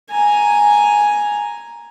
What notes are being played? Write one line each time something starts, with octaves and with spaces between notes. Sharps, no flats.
G#5 A#5